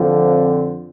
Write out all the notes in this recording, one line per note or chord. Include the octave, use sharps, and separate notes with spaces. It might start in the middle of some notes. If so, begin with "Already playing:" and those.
Already playing: F2 D3 F3 C4